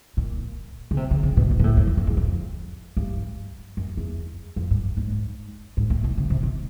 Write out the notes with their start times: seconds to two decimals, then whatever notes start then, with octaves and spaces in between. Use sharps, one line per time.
0.17 A#2
0.91 C#3
0.97 C3
1.11 C#3
1.23 C#3
1.37 B2
1.51 B2
1.59 A#2
1.64 A2
1.77 F2
1.87 F2
1.97 F2
2.07 E2
2.17 F2
2.97 G2
3.77 F#2
3.97 E2
4.56 F2
4.71 G2
4.97 G#2
5.77 G#2
5.90 A2
6.04 B2
6.18 C#3
6.30 C3
6.43 B2